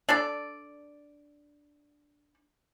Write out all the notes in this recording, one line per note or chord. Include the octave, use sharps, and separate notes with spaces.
D4 A4 D5